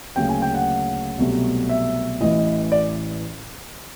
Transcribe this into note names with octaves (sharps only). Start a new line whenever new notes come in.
D2 C#3 F#3 A#3 C#4 G5
G#5
G5
F#5
C2 B2 F#3 A3
E5
A1 A2 E3 D#5
D5